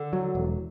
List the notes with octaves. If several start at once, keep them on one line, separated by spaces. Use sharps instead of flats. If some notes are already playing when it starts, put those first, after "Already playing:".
Already playing: D3
F#3
E1